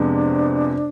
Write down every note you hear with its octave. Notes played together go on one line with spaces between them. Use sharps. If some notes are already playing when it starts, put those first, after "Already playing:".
Already playing: F2 C3 G#3 B3 D4